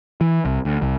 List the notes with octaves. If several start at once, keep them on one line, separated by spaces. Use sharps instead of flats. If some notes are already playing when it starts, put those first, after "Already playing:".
E3
C2
D2
C2